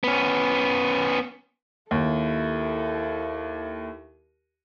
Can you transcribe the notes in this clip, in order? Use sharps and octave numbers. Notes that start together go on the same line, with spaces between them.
B3 C#4
D#2 E4 A4